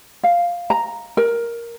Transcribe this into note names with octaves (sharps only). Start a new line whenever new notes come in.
F5
A#5
A#4